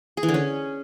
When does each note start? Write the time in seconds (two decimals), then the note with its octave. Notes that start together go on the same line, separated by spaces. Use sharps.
0.17 G#4
0.23 E3
0.29 D3
0.34 C#4